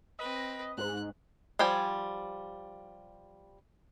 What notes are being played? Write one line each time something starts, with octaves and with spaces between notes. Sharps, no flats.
C4 B4 D#5
G#2 F#6
F3 G3 G5 G#5